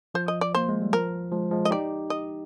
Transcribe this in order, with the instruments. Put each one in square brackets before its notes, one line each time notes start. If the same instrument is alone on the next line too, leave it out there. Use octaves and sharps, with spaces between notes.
[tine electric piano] F3 [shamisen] C5
[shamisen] D#5
D5
[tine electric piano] A#3 [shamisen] C5
[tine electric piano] G#3
G3
[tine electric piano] F3 [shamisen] A#4
[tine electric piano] F3 G#3
F3 G#3
[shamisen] D#5
[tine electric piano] D#4 G4 [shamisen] D5
[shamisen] D#5